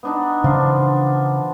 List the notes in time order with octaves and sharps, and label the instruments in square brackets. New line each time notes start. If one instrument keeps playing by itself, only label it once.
[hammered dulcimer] B3 D4 D#4
[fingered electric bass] C#3 E3 [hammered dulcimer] F3 D4 F4